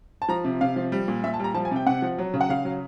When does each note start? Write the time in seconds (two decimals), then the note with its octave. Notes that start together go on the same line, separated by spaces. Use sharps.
0.22 A5
0.29 F3 A#5
0.45 C3
0.61 C3 F5
0.76 F3
0.92 G3
1.08 A#2
1.23 A#2 E5
1.34 A5
1.40 G3 A#5
1.54 F3 A5
1.65 G#5
1.71 C3 G5
1.87 C3 F#5
2.02 F3
2.18 F#3
2.34 C#3
2.41 F#5
2.50 C#3 F5
2.65 F#3